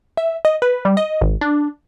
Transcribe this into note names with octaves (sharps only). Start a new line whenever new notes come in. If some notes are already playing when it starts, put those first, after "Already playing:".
E5
D#5
B4
G3
D#5
G#1
D4